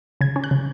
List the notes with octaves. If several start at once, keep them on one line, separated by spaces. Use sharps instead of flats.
C#3 G#6
C#4
F#6
C#3